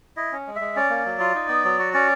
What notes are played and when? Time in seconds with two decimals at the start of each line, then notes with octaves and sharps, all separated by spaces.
0.16 E4 D#5
0.32 C#4
0.47 G#3
0.56 E5
0.61 G#3
0.76 C#4 D5
0.90 A#3
1.05 F#3
1.20 F4
1.35 D#4
1.49 B3
1.65 F#3
1.79 F#4
1.94 C#4 D5